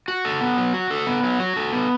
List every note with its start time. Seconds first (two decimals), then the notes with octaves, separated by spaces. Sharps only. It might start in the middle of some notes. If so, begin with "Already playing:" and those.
0.08 F#4
0.25 A4
0.41 B3
0.57 F#3
0.74 F#4
0.90 A4
1.07 B3
1.24 F#3
1.40 F#4
1.56 A4
1.73 B3